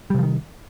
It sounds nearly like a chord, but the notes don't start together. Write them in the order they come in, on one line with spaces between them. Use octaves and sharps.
G3 C3 F3 D#3